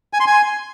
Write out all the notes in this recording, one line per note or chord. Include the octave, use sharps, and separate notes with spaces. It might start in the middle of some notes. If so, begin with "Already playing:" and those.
G#5
C6
G#5